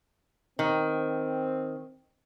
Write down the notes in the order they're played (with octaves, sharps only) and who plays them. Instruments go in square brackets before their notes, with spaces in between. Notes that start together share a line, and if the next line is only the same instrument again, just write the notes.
[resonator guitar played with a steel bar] D#3 [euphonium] C4